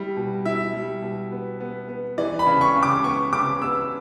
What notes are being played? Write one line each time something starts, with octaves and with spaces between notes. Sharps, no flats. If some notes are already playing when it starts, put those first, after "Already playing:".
Already playing: G3 E4
B2
E4 E5
G3
B2
B3
B3
B3
E3 D5
B5
C#3
C#6
C#3
D6
B3 C#6
C#3 D6
B3 E6